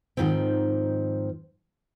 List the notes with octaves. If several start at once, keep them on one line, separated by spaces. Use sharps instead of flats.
G#2 B2 D#3 F3 C4